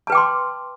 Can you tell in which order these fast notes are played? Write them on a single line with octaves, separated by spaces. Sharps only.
A5 B4 G5 D6 C6